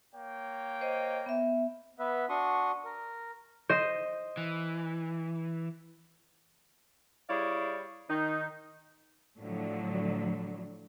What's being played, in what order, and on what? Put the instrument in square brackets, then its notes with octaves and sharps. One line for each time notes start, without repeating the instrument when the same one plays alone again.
[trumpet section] A#3 C#5 G5
[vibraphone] C5 D#5
B3 E5
[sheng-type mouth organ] B3 B4 E5
D4 F#4 C6 C#6 D#6
A#4
[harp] C5 D#5
[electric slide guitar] E3
[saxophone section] G3 E4 G#4 C#5 D5 F5
D#3 D#4
[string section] A2 D3 F3 F#3